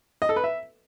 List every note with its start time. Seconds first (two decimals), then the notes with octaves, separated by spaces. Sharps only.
0.22 D#5
0.29 A4
0.36 B4
0.44 E5